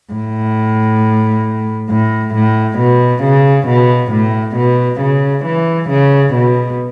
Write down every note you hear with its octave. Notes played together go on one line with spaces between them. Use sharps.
A2
A2
A2
B2
C#3
B2
A2
B2
C#3
E3
C#3
B2